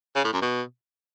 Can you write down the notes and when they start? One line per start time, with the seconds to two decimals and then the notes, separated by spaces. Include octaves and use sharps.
0.16 C#3
0.24 A2
0.33 F#2
0.42 B2